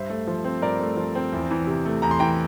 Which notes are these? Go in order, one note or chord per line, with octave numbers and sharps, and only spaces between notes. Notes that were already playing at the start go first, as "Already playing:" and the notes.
Already playing: G2 C5 E5
A3
F3
C4
G2 A#4 D5
A3
F3
C4
E2
E3
C3
A3
E2 A#5
C6
E3 G5 A#5